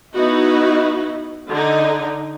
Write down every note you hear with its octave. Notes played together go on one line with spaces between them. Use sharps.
B3 D#4 E4 F#4
D3 D#4